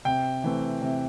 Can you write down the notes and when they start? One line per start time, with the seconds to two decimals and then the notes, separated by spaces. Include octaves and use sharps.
0.05 C3 G5
0.44 E3 A3 C4
0.82 C3